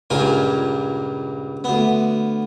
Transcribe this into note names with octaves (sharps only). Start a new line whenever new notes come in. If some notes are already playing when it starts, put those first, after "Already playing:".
C#2 G2 A#2 F4 A#4 G#5
D2 B3